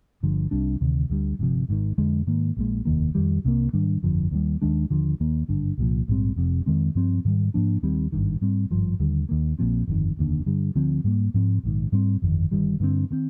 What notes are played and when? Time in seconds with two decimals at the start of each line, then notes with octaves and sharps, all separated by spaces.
0.23 G1 G2 D3 F3
0.51 C2 C3 G3 D4
0.81 D2 C3 D#3
1.10 D2 D3 G3
1.39 G1 F2 C3 F3
1.69 G#1 G#2 D#3
1.98 F2 D3 G#3
2.27 G#2 D#3 A#3
2.57 A#1 A#2 G#3
2.85 F1 D#2 D#3 A#3
3.15 F2 D#3 G3
3.44 C2 C3 F3 A#3
3.73 G#2 D#3 G3 D4
4.03 G1 F2 D3 F3
4.31 D#2 D#3 G3
4.62 D#2 D#3 G#3 D4
4.90 D#2 D3 F3
5.20 D#2 D#3 A#3
5.48 G#1 G2 D3
5.78 C2 A#2 F3
6.08 A#1 G#2 G3 C4
6.36 F1 F2 C3
6.66 F2 D#3 G#3 C4
6.95 G2 F3 C4
7.25 G#2 D#3 G3
7.54 G#2 F3 A#3 D4
7.83 D#2 D#3 G3 C4
8.12 G#1 G2 D#3
8.41 G#2 G3 C4
8.71 G#1 G2 F3
9.00 D#2 D3 G3
9.29 D#2 D#3 A#3
9.59 A#1 A#2 F3 C4
9.87 G1 F2 D#3
10.17 F1 D#2 D3
10.46 G2 D3 G3
10.75 D2 D3 F3 C4
11.04 G#2 G3 A#3
11.34 G#2 F3 C4
11.63 A#1 G#2 D#3
11.92 G#2 G3 C4
12.22 G1 F2 D#3
12.51 G1 G2 D#3 G3
12.80 G2 D3 G3 C4
13.10 D#3 G#3 C4